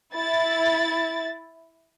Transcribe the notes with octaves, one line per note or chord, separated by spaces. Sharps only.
E4 A6